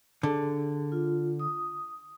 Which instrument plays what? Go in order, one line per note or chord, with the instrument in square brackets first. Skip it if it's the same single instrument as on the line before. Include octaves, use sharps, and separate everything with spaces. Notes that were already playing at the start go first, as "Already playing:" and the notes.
[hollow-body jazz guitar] D3 [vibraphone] G#4
[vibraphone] F4
D#6